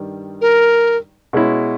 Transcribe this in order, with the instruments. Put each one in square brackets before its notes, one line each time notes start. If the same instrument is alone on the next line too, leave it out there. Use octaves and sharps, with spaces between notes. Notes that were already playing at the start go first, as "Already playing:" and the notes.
Already playing: [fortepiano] G2 D#3 G3
[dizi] A#4
[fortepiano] B2 G#3 C#4 E4